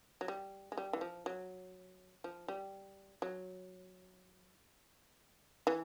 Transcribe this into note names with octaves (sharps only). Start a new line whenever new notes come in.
F#3
G3
G#3
G3
E3
F3
F#3
F3
G3
F#3
E3